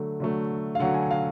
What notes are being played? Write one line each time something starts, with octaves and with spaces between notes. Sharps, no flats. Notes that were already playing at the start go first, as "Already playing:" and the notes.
Already playing: D3 F#3 A3
D3 F#3 A3
F5
D3 F#3 A3 F#5
G#5
F5